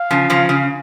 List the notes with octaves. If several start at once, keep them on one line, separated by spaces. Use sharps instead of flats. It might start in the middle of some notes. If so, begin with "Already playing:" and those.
Already playing: F5
C#3 F3
C#3 F3
C#3